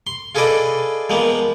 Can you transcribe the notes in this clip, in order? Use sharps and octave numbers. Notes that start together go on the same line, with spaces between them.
C6
F4 G#4 A4 B4 D5 D#5
F3 G#3 A#3 B3